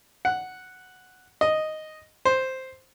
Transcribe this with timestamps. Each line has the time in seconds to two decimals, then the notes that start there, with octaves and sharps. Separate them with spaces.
0.25 F#5
1.41 D#5
2.25 C5